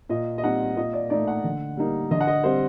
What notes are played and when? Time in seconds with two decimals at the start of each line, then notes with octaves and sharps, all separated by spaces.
0.09 A#2 D#5
0.38 D#5
0.43 G3 C4 D#4 F#5
0.76 A#2 D#5
0.93 D5
1.10 A3 D#4 D5
1.27 F#5
1.44 D3
1.77 G3 A#3 D#4
2.11 D3 D#5
2.21 F#5
2.27 D#5
2.44 G3 C4 C5